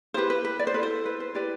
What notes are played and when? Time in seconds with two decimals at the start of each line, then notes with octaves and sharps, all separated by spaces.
0.14 E4 G4 B4 C5
0.30 B4
0.45 B4
0.59 D5
0.67 C5
0.74 E4 A4 B4
0.83 C5
1.06 B4
1.20 C5
1.34 E4 G4 B4 D5